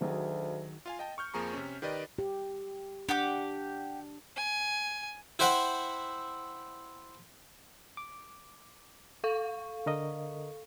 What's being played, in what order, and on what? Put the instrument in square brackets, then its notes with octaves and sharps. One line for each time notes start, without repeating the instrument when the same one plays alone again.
[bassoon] D2 [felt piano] D#3 F#3 G#4
[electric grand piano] F4 F5 G#5
D#5 G5 A5
C#6 F6 G6
F2 F3 A#3 G#4 A#5 C#6
C3 C#4
D#3 G4 B4 D5 D#5
[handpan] G4
[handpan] D4 [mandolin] G4 F#5 D6
[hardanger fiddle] G#5
[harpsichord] E4 C5 E5 F#5 G5
[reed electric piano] D6
[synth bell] A4 F5 C#6
[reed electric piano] D3 A#4 D#5